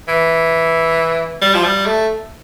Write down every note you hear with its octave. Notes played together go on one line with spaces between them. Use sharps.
E3
G3
F3
G3
A3